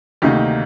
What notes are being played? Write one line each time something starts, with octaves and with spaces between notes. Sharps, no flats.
D2 C3 D#3 A#3 D#4 G4